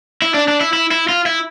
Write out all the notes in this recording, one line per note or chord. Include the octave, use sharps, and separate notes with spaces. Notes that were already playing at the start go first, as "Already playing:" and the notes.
E4
D4
D4
E4
E4
E4
F4
E4